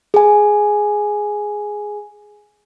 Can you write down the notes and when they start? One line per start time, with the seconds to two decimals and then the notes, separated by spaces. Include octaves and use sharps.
0.14 G#4 G#5